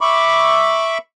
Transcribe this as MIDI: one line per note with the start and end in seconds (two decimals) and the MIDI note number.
0.01 0.98 76
0.01 0.98 83
0.01 0.98 85
0.01 0.98 86